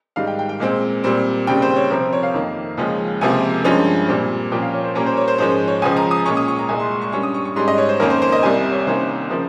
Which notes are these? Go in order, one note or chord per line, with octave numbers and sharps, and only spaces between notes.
G#2 D#3 G3 F5
G5
G5
G5
A#2 G#3 C4
A#2 G3 C4
D#2 C#3 G3 C4 G5
C5
C#5
C3 F3 C4 A#4
C5
C#5
F5
F2 D#3 A#3
D#2 C#3 F3 G#3 C#4
C#2 C3 F3 A#3 G#5
G2 F3 G#3 C#4
A#2 G3 C4
A#2 F3 A#3 C#4 G5
F5
C#5
C5
A#2 G3 A#3 C#4 A#4
C5
C#5
C5
G#2 F3 G#3 C#4 C5
C#5
C#2 C#3 F3 G#5
A#5
D#6
A#2 G#3 C#4 C#6
D#6
C#6
A#5
C2 A#2 G#3 G#5
C6
C#6
C#6
G2 G3 C#4 C#6
D#6
C#6
C#6
G#2 G3 C#4 C6
D#5
C#5
C5
F2 D#3 A#3 C#4 A#4
C5
C5
D#5
C2 C3 G3 G#5
C#5
C2 C3 D#3 A#3 C#4 C5
C#3 F3 A#4